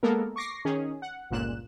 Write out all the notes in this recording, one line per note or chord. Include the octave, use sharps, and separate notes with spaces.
G#3 A#3 B3 A4 A#4
C#6 D6 A#6 C7
D#3 C#4 G#4
F#5
G1 C#2 A#2 F#6 E7